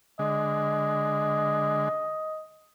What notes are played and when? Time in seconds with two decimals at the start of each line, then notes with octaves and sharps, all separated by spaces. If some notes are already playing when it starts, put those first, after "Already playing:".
0.19 D3 G#3 D#5